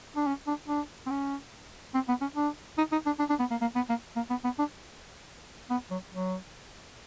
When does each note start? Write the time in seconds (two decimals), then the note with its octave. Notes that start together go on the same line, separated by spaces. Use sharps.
0.16 D4
0.27 C#4
0.47 D4
0.68 D4
1.06 C4
1.10 C#4
1.94 C4
2.08 B3
2.21 C#4
2.35 D4
2.78 D#4
2.92 D#4
3.06 D4
3.19 D4
3.29 D4
3.39 B3
3.50 A#3
3.61 A#3
3.75 B3
3.89 A#3
4.16 A#3
4.30 B3
4.44 B3
4.58 D4
5.70 B3
5.90 F#3
6.11 F#3